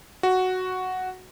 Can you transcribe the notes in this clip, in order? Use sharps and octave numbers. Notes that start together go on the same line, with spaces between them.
F#4